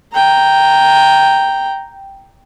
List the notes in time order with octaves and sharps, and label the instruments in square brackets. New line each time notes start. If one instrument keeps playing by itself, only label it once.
[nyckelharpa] G5 A#5